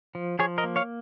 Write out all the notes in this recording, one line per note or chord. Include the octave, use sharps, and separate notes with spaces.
F3
F3 G#4 C#5
A#4 D#5
A#3
C#5 F5